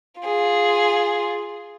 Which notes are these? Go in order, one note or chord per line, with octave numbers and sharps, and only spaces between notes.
F4 G#4